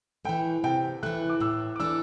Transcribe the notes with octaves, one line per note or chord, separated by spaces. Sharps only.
E3 A3 G5
C3 G5
E3 A3 F#6
D6
A2 E6
D6
E3 A3 D4 E6